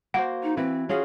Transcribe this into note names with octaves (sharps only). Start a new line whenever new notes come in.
A#3 F#4 C5 F#5
D#4
E3 C4 B4
C#4 F4 F#4 G#4